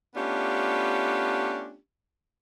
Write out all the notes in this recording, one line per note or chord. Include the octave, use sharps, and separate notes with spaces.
A3 B3 C#4 D4 F4 G4